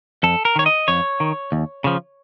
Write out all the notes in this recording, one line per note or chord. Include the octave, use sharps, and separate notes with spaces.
F2 A4
A#4
D#3 C#5
D#5
F2 C#5
D#3
D#2
C#3 F3